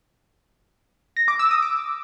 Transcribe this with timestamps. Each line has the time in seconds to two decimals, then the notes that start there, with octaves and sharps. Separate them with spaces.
1.17 A#6
1.28 D6
1.39 E6
1.51 D#6
1.62 D6